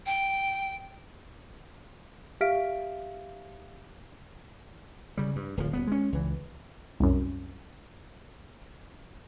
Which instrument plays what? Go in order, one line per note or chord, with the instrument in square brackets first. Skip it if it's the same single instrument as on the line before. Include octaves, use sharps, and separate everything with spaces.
[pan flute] G5
[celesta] G4 E5 F5 F6 B6 D7
[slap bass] C#3 G3
G2
D1 F3
D#1 B3
G#3 C#4
C#2 E3
[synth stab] C2 F#2